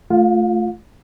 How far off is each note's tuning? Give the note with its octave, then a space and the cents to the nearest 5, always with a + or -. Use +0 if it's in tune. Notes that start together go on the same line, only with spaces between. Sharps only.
A3 -5 F4 +0 F5 +40